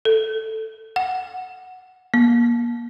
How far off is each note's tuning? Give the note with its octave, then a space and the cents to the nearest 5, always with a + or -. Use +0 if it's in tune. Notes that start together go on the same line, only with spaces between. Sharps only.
A4 +5
F#5 +0
A#3 +30